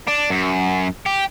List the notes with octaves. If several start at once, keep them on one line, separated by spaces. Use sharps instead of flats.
D4
F#2
G4